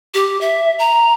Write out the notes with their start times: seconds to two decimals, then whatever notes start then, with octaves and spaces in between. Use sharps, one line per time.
0.14 G4
0.41 E5
0.79 A#5